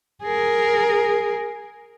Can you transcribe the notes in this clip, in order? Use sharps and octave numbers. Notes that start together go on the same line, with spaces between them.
G#4 A#4